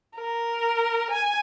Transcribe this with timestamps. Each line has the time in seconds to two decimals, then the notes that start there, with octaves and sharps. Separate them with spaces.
0.16 A#4
1.10 G#5